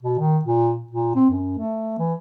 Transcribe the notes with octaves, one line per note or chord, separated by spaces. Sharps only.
B2
D#3
A#2
A#2
C4
F#2
A3
E3